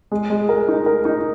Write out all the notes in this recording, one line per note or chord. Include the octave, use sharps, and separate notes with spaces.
G#3
G#3
A#4
D#4
A#4
D#4